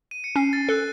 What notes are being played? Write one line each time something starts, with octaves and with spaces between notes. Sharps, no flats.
D#7
C#7
C#4 C7
A6
A4 F#6